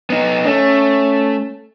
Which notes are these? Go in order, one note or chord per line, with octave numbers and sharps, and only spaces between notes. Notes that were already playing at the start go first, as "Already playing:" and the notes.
B3 D#4
A3 C#4